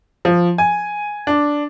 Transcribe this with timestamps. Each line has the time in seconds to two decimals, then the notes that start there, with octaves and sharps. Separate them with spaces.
0.25 F3
0.58 G#5
1.27 D4